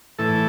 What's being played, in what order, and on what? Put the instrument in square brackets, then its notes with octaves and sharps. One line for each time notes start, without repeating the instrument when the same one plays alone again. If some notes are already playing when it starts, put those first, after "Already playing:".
[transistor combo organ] A2 E3 A4